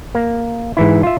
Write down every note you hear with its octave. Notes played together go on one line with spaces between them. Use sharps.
A#3
G#2 E3 E4
F4 E5